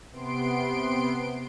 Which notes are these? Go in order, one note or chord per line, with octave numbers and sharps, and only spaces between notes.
C3 B3 C6 D7